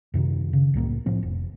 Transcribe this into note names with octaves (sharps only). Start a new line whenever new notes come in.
F#2 C3 D#3
C#3
C2 A2 F3 A#3
A2 F3 C4
F1